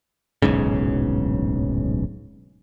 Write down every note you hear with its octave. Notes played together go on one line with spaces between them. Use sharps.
D1 B1 G#2 C#3